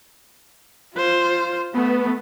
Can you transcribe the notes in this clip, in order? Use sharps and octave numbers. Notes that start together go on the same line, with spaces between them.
F4 C5
A3 B3